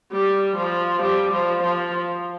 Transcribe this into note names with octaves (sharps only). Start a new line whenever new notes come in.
G3
F3
G3
F3
F3